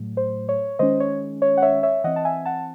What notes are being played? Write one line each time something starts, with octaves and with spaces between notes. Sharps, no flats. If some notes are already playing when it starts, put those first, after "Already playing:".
Already playing: A2 F#3 A3
C5
C#5
D#3 G#3 C#4 C5 D#5
C#5
C#5
F#5
C#5 E5
C#5 E5
E3 C4 D#5 F#5
A5
E5 G#5
F#5 A5